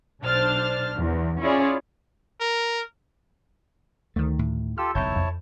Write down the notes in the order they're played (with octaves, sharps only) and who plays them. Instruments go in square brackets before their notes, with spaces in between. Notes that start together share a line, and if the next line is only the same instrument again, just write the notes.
[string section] B1 D4 C5 F6 A6
E2
C#4 E4 F4 G#4 C#5 D5
[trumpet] A#4
[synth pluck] D2 D#3 [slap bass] A3
[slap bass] A2
[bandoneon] F4 G4 A4 [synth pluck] E6
[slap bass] F#1 B1 E2 [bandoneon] E4 C#5 A5 [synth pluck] G6
[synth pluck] F2